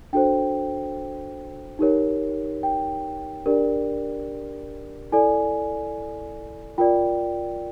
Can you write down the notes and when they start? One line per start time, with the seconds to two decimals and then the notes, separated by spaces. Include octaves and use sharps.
0.13 D4 F#4 A4 C5 G5
1.79 D#4 G4 A#4 C#5
2.63 G5
3.46 D4 G4 A#4 D5
5.12 E4 A4 D5 G#5
6.78 F4 A#4 D5 G5